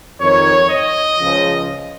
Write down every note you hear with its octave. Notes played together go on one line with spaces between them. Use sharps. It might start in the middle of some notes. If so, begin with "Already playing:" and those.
F2 D#3 C#5
D#5
C#2 C#3 F3